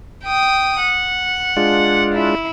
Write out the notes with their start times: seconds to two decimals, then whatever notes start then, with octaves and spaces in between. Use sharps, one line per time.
0.24 G5 D#6
0.81 F#5
1.57 G#3 D4 F4
2.14 E4